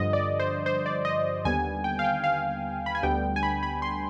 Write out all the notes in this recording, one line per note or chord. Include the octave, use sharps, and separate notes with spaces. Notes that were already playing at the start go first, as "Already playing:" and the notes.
Already playing: G2 D3 F3 D#5
D5
C5
C5
D5
D#5
D#2 D3 G3 B3 G#5
G5
F5
G5
F5
B5
G#5
D2 D3 G3 B3 G5
G#5
B5
B5
C6